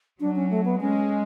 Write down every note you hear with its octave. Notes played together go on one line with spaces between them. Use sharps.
F#3 D4
C#4
A3
B3
G#3 C#4